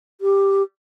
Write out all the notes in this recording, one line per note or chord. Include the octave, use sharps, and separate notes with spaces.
G4